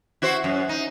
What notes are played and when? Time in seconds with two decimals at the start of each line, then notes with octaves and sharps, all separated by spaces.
0.22 E4 F#4 C5
0.44 F#2
0.69 D#4